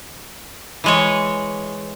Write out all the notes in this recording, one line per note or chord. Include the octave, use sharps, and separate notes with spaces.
E3 G#3 C#5